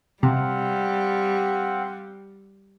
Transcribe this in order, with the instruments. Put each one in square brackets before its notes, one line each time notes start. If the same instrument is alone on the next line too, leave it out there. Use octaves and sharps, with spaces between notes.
[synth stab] C3 [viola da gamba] G3 [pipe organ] C4 F5 F#5